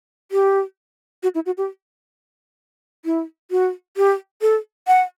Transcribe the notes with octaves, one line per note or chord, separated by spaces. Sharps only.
G4
F#4
E4
F#4
G4
E4
F#4
G4
A4
F#5